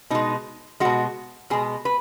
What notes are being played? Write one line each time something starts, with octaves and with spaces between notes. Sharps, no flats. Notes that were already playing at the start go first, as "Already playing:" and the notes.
B2 G#3 D#4
B2 G#3 F#4
B2 G#3 G#4
B4